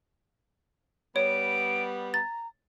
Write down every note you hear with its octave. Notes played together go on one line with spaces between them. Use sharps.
G3 B3 C#5 D7
A#5 A6